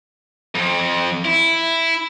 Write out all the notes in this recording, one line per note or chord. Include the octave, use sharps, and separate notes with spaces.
F2
E4